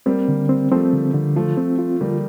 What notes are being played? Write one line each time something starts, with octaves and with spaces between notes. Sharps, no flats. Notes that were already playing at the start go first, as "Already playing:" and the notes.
G3 A#3 C4
D3
C4
F3 A3 C4
D3
D3
F3 A3 F4
C4
F4
D3 G3 A#3